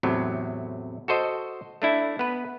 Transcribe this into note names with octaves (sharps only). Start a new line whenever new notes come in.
E2 A2 C3 F#3
F#4 A4 C5 D#5
A3 D4 E4
B3 B4